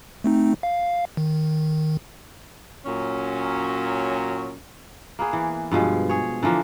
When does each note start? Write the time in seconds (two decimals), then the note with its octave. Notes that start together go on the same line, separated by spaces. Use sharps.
0.24 A3 C4 D#4
0.63 F5
1.17 D#3
2.86 A#2 F#3 C#4
5.19 A#3 B3 G#4
5.33 E3
5.71 G2 B2 F3 G#3
6.09 G#4 C#5
6.43 D3 E3 F3 A#3